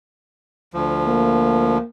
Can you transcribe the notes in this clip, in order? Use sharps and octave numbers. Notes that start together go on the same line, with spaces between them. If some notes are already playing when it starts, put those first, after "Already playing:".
D2 F3
A#3